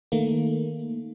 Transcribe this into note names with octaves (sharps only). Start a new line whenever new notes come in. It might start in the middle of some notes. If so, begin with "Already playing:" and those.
D#3 A3 A#3